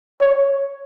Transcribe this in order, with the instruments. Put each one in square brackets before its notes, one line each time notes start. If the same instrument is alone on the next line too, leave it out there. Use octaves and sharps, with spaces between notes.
[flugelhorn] C#5